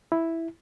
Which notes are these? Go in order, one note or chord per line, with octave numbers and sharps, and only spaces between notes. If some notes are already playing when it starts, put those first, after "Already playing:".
E4